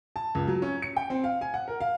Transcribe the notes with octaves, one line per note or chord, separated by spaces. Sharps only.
A5
C#2
F#3
C#4
C#7
G5
C4
F5
G#5
F#5
A#4
F5